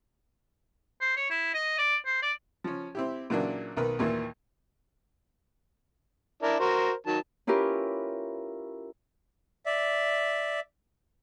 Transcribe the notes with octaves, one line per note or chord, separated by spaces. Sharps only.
C5
C#5
E4
D#5
D5
C5
D5
F3 C#4
C4 E4 G4
A#2 C#3 E3 F#3 A#3 D4
B1 D#3 A#4 B4
D#2 A#2 D#3 E3
D4 E4 A#4
F#4 A#4 C5
D#3 F#3 A5
C#4 E4 F4 G4 A#4 B4
D5 E5